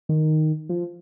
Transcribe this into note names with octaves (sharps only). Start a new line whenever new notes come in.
D#3
F3